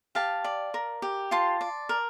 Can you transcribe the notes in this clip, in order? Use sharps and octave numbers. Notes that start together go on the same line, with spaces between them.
G4 F5 A5
D5
A#4
G4
F4 A5 C6
D5
A#4